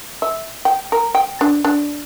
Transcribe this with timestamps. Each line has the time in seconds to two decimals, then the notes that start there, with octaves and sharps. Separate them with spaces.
0.22 E5
0.65 G5
0.92 A#4
1.15 G5
1.41 D4
1.64 D4